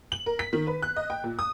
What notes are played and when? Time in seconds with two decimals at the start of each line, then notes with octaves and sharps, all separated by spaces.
0.12 F#7
0.26 A#4
0.39 B6
0.53 D#3
0.67 B4
0.82 F#6
0.96 D#5
1.10 G5
1.24 A#2
1.39 D#6